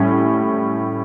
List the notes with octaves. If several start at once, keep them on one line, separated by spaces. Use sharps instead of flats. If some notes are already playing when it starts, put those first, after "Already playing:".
Already playing: A2 G3 C#4